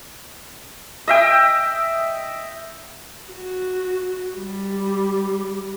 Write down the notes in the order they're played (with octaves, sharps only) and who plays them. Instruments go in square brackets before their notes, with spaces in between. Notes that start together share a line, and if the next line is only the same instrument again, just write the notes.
[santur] D#5 E5 G5
[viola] F#4
G3